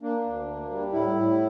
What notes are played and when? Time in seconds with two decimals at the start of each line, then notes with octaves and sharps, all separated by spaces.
0.02 A#3 D4
0.25 D2
0.48 A#3
0.71 G3
0.93 A2 E4
1.15 A2